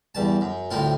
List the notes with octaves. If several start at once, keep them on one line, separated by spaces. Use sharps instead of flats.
E2 G2 A5
F#2
D2 A2 C4 F4